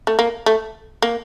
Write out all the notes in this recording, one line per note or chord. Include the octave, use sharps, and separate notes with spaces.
A3
A#3
A3
A#3